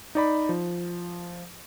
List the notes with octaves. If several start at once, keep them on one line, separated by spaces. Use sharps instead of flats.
D#4 D5 B5
F3